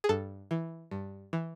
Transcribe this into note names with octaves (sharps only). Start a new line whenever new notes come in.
G#4
G2 A4
E3
G2
E3